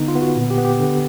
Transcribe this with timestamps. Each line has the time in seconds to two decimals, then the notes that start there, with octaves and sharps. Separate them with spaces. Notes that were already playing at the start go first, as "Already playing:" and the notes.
Already playing: D3 B3 D#4
0.08 F4
0.15 B3
0.22 F#4
0.36 A#2
0.50 G4
0.58 B3
0.65 G4
0.79 D3